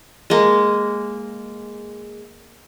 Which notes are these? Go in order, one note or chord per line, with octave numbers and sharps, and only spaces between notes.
G#3 A#3